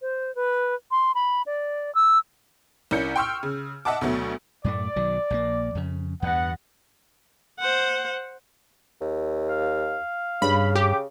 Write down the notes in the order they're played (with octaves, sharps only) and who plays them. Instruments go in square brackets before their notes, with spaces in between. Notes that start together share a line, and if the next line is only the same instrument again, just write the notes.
[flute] C5
B4
C6
B5
D5
E6
[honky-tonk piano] C2 C#4 E4 A#4 G6 C#7
G5 C6 C#6 E6 F6
C#3
D#5 E5 F#5 A5 D6
D2 B2 F#3 A3
[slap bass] F#2 A2 A3 [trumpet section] D5
[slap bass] B1 D#3 F#3
A#1 D3 A#3
F2 C#3
[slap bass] E2 G2 [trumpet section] B3 F#5
[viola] C5 F#5
[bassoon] D#2
[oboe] F5
[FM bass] G2 [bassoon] C#3 [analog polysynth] B5
[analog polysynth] G4 [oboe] D6